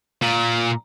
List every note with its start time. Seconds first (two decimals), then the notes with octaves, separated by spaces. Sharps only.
0.22 A#2